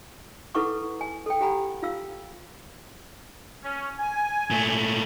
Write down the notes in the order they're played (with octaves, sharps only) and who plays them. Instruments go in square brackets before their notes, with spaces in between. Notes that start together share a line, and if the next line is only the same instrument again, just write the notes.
[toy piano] E4 A4 B4 F#5 C#6 D6
G#5
A4 G5
G4 F#5 G#5 A#5 B5
F4 F5 E6
[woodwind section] C#4
G#5
[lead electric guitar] A#2 A3